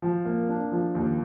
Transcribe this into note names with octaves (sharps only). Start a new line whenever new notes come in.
F3
A#3
D4
F3
D#2